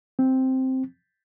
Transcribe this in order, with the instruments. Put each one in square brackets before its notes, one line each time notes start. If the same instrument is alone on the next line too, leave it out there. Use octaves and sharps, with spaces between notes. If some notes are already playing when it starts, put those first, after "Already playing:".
[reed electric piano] C4